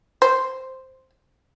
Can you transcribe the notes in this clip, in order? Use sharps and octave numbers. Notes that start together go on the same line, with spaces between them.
C5